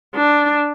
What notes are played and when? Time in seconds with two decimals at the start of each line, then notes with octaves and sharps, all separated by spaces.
0.15 D4